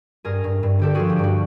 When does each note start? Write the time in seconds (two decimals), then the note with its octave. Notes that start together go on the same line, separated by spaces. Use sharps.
0.25 G2 G#4 A#4
0.44 G2
0.63 G2
0.79 D3 G4 A4
0.95 F3 F#4 G#4
1.09 G4
1.19 G2 F#4